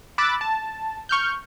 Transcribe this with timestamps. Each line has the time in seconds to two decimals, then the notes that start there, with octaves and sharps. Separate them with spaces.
0.18 B5 D6 E6 F#6 A6
0.41 A5
1.09 C#6 F6 G6